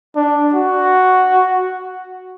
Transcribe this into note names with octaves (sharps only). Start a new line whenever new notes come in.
D4
F#4